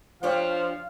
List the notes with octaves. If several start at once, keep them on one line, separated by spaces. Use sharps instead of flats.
F3 D4 G4 C#5 F5